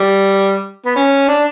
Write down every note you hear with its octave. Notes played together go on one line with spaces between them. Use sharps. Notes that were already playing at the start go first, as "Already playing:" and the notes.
Already playing: G3
B3
C#4
D4